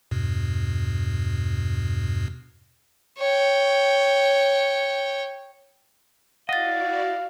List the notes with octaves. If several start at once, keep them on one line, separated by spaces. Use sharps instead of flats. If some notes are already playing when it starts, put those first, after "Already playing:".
E2 G2 B2
C#5 G5
E4 F#4 D5 D#5 F5 F#5 A6